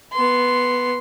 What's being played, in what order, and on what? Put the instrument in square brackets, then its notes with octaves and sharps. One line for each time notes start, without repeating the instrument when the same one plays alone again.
[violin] B3 C6